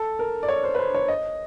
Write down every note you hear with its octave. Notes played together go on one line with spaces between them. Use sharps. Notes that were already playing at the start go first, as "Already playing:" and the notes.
Already playing: A4
A#4
D5
C#5
C5
B4
C5
C#5
D#5